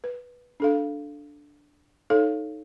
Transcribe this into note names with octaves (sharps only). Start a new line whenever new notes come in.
B4
D4 A4 F5
D#4 A4 C#5 F5